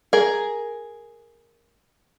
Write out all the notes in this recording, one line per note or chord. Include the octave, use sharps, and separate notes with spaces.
G#4 A#4